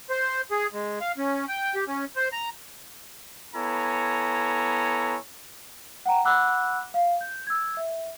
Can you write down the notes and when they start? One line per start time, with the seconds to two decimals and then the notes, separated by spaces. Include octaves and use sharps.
0.10 C5
0.51 G#4
0.73 G#3
1.01 F5
1.18 C#4
1.48 G5
1.75 G4
1.88 C#4
2.16 C5
2.32 A#5
3.55 B3 E4 A4 C#5 G#5 A#5
6.06 F#5 G5 A#5
6.25 F#5 B5 D6 E6 F#6
6.94 F5
7.21 G6
7.47 E6 G#6
7.77 E5